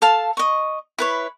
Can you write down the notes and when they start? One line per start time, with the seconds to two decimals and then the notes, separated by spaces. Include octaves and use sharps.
0.02 A4 F5 A5
0.37 D#5 C#6
0.98 E4 B4 C#5